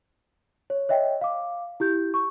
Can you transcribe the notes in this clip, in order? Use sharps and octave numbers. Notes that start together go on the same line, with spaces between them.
C#5
C#5 D#5 E5 G5
F5 D6
E4 G4 G6
C#6